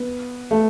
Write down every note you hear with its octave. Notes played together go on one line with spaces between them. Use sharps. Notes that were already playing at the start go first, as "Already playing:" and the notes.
Already playing: B3
A3